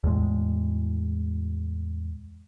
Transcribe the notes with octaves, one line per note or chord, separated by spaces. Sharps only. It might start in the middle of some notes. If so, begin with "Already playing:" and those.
E2 A2 G#3